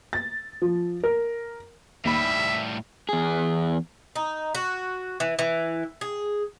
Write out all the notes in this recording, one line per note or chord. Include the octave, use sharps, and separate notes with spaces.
A6
F3
A#4
D#2 A2 G3 E5 B5
E2 G#4
D#4
F#4
E3
E3
G#4